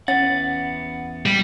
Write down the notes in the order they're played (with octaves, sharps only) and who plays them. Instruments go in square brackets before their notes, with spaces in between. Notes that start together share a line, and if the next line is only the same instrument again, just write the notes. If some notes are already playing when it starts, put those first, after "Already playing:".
[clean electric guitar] E2 B3 F#5 [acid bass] C#4 [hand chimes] A6
[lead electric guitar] G3